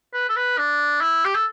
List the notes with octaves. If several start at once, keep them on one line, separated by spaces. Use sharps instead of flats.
B4
A4
B4
D4
E4
G4
A4